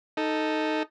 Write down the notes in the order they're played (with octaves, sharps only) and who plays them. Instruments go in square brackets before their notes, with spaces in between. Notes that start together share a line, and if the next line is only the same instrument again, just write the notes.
[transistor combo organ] D#4 A4